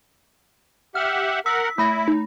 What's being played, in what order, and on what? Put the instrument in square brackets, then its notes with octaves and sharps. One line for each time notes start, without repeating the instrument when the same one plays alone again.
[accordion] G4 E5 F#5 [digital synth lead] F6
[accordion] A#4 F#5 [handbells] E6 [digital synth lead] B6
[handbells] A3 B5 A#6 [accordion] E4
[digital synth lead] D#4